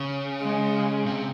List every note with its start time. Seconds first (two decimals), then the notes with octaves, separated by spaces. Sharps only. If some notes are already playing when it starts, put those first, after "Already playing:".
Already playing: C#3
0.42 G#3
1.05 C3